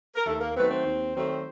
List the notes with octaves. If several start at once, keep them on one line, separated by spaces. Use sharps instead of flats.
A#4
D#2 A3 A4
A#3 A#4
D#3 F#3 A3 B3 C4 B4
C4 C5
D#2
D#3 F#3 A3 C4